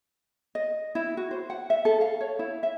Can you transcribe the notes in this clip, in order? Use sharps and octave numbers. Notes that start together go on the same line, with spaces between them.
D#5
E4
F#4
C5
F#5
E5
A4
F5
C#5
E4
E5